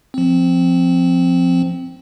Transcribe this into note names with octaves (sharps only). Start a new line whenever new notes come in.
F3 C4